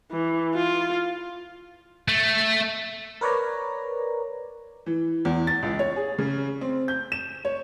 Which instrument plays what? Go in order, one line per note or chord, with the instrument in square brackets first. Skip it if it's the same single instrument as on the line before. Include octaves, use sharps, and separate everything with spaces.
[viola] E3
F4
[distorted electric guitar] A3
[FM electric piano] A#4 B4 C#5 D5 A#5
[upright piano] E3
E2
A6
C#2
C#5
G#4
C#3
C4
G6
E7
C#5